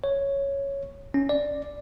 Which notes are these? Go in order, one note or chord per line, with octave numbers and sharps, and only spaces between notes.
C#5
C#4
D5